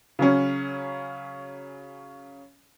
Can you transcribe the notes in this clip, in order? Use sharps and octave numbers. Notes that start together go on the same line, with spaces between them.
C#3 F#3 C#4